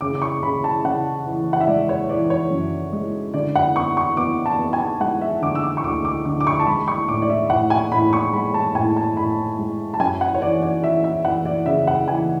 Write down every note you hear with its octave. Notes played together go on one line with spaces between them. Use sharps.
C#3 D6
D6
C#6
C#3 B5
A5
C#3 F#5
E3
F#5
E5
G#3 D5
C#5
E3 D5
C#5
F#2
G#3
D3 D5
F#5
B3 C#6
C#6
B3 D6
A5
B3
G#5
G#3 F#5
E5
D3 D6
E6
D6
C#6
D2 D6
D6
D3 D6
D6
C#6
A5
G#3 B5
C#6
A2 D6
D5
E5
A2 F#5
G#5
A2 B5
C#6
G#3 B5
A5
A2 G#5
A5
A2 B5
G#3
A5
F#2 G#5
F#5
C#5
E3 D5
D5
E3 E5
E5
E3 F#5
D5
C#3 E5
F#5
E3 G#5